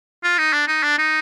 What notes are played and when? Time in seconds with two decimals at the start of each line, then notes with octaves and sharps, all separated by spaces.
0.24 F4
0.38 D#4
0.53 D4
0.68 D#4
0.83 D4
0.98 D#4